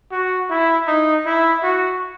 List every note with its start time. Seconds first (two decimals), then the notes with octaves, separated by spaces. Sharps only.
0.11 F#4
0.50 E4
0.87 D#4
1.26 E4
1.63 F#4